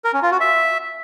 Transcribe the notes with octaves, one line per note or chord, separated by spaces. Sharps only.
A#4
C#4
F4
F#4
E5